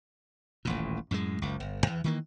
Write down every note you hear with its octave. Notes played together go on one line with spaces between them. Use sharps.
D#1 A1 A#2
F#2 A2 G3 G#3
F#1 C#2
G1
E2 E3
D#3 E3 A#3